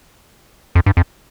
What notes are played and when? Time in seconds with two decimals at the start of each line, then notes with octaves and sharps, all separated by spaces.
0.75 F2
0.86 G2
0.97 F2